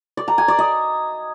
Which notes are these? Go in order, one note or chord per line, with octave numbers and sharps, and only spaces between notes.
D5
A#5
G#5
D5
D#5